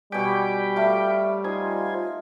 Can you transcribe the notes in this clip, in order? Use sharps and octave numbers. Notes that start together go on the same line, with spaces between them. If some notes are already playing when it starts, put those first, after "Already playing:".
B2 G3 C#5 G5 G#5 B5 D6
A3 F4 E5
D#4 F4 C5 G#5